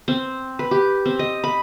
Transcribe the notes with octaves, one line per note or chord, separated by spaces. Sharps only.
C4
B4
G4
C4
D#5
B5